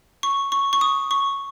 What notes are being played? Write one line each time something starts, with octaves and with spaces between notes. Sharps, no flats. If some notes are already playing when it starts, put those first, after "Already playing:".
C#6
C#6
C#6
D#6
C#6